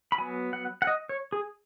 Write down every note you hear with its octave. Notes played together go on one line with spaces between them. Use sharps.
B5
F#3 B3 G#5
F#5
F#5
D#5
C#5
G#4